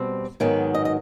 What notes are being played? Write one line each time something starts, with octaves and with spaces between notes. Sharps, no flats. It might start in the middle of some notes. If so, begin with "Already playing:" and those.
Already playing: B2 G3 C4
G#2 D#3 F#3 B3
D#5
D#5